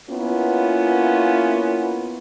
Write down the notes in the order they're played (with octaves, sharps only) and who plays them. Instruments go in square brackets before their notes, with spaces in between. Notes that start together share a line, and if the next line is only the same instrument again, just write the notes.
[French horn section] A#3 B3 C#4 E4 F4